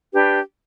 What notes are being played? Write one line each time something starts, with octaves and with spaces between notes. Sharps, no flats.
D4 G4 B4